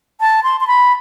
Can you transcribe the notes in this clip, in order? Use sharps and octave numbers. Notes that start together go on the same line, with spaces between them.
A5
C6
C6
B5